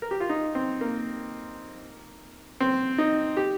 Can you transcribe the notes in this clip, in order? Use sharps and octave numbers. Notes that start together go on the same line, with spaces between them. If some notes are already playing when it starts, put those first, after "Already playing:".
A#4
G4
F4
D#4
C4
A#3
C4
D#4
G4